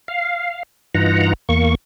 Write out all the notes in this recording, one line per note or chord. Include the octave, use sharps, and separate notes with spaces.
F5
G2 E3 D#4 F4 F#5 A#5
E2 A#3 C#6